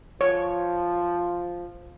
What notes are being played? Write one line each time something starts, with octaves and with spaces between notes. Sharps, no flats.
F3 C#5